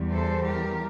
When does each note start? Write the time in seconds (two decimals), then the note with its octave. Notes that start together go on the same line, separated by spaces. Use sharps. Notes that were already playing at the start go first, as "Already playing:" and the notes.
Already playing: E2 E3 G3
0.12 A4 C5
0.46 G4 A#4